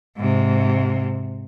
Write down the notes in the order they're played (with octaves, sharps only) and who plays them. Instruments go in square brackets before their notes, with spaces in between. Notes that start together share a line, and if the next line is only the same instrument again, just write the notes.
[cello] G#2 C3